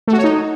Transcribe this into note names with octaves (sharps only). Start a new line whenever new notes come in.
A3
F#4
C#5
D#4